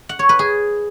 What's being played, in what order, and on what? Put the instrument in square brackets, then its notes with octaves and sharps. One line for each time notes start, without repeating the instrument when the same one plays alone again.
[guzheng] F#5
C#5
B4
G#4